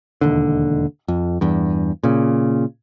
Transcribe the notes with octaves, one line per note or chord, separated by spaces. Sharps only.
E1 D#2 D3
F2
E2 G2
A#2 C#3